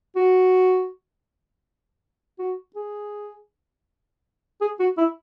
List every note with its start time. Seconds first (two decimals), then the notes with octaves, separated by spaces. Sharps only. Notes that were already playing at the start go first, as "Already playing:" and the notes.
0.16 F#4
2.39 F#4
2.76 G#4
4.61 G#4
4.79 F#4
4.98 E4